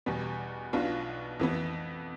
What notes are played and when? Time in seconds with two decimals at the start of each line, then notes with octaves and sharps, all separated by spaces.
0.06 E2 B2 G3 B3
0.73 B1 B2 B3 D4 F4
1.40 F2 E3 B3